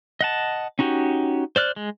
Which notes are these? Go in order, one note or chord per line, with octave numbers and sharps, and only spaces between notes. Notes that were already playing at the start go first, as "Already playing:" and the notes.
D#5 F#5 A5
C#4 D#4 F#4 G4
C5 D5 F6 F#6
G#3